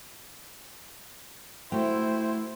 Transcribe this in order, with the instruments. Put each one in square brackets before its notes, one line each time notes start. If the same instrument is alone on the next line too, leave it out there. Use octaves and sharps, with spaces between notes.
[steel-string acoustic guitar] A3 F#4 G5 [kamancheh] E4 C5